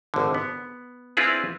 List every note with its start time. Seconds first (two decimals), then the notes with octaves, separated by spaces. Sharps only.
0.14 G#1 D3
0.34 B3
1.17 C4 D4 E4 F4 G#4 B4